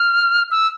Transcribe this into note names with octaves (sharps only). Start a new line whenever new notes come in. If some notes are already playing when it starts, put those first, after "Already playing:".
Already playing: F6
E6